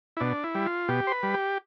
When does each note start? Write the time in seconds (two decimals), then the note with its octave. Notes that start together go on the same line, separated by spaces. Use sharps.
0.17 E4
0.20 B2 D4
0.44 E4
0.55 G3
0.66 F4
0.88 B2 G4
1.07 C5
1.12 B4
1.23 G3
1.34 G4